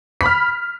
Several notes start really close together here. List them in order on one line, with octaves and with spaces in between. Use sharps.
B6 B5 F6